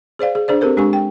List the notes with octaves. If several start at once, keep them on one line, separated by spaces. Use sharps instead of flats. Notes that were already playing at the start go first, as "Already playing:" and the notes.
G#4 C5 D5 F5
G#4
D4 G#4 C5 D5
C4 G4 A4 A#4 C5
G#3 D4 G4 G#5 C#6
G5